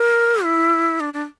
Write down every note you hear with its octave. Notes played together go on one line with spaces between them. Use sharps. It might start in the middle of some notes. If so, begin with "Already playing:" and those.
Already playing: A#4
E4
D4
D4